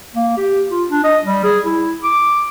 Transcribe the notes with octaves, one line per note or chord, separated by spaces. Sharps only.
A#3
G4
F4
D4
D#5
G3
G#4
E4
D6